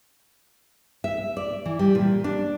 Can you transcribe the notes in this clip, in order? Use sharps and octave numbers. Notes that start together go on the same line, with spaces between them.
E5
D5
E3
G3
A#2
D4